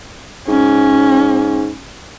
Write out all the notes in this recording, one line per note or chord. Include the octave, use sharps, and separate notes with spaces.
G#2 C#4